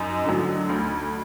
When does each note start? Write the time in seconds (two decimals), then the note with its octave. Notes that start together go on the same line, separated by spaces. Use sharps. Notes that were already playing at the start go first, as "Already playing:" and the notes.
Already playing: F#2 D#4
0.25 D3 F#3
0.69 D2